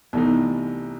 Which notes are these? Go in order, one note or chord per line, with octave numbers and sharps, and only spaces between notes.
C2 C3 E3 A3 B3 D#4